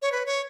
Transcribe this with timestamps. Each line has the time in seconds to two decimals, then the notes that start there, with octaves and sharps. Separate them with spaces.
0.02 C#5
0.12 B4
0.26 C#5